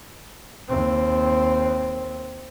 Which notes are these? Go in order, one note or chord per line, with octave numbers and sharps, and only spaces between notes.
D#2 C4